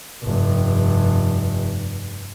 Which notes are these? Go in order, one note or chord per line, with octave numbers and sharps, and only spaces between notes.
F1 G2